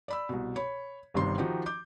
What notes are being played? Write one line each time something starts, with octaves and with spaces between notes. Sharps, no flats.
D5 B5 E6
C2 B2
C#5 B5
G1 G2 C3 D#3 C6
D#3 F3 D#4 F#4 G4
D6 G6